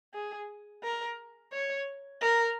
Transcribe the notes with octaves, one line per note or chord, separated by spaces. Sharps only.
G#4
A#4
C#5
A#4